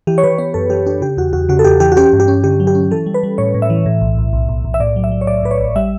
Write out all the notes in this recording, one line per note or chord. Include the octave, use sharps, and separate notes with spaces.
E3 G4
C#5
E3 B4
B3 C#5
F#2 A4
E3 G4
D4 G4
C#3 G4
E2 F#4
E2 F#4
C#3 F#4
A4
E2 G4
E3 G4
F#4
C#4 G4
G2
G4
C#4
D3 G4
F#3
G4
C#4
E3 A4
G3
B4
G3
A2 C#5
A2
E5
E3
A2
B1
B1
B1
B1
B1
E5
A2 D5
F#3
E5
F#3
C#5
A2 D5
A2 B4
C#5
A1
G3 E5